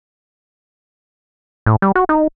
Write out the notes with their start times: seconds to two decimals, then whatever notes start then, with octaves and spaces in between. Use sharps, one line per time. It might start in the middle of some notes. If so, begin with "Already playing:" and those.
1.66 A2
1.82 G3
1.95 F#4
2.09 D#4